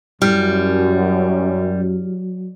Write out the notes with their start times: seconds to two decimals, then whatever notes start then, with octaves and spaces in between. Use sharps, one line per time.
0.22 F#2 F#3 G3 E4 G4 F6